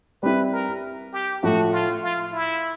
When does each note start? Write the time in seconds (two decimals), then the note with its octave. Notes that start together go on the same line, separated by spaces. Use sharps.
0.23 G3 C4 E4 B4
0.52 A#4
1.13 G4
1.42 A2 F3 A3 F#4
1.72 F4
2.02 F4
2.32 E4